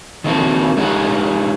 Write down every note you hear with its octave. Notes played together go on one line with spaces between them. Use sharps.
D#3 A#3 C4 D4 F#4
G#3 D#4 F4 G4 F#5